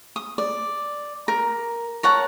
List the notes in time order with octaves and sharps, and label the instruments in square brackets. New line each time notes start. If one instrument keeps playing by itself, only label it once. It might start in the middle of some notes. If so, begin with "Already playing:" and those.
[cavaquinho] D#6
D5
A#4
A#4 C#5 F#5 A5